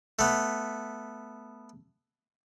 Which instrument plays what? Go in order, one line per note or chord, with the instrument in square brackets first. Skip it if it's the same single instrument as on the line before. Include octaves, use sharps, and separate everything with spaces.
[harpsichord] A3 B3